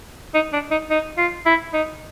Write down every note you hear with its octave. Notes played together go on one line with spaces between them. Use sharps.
D#4
D4
D#4
D#4
F4
E4
D#4